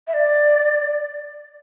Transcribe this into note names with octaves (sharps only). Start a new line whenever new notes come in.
E5
D5